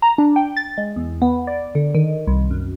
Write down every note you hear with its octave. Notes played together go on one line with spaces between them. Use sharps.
A#5
D4
G5
A6
G#3
E2
B3
D5
D3
D#3
C2
F#2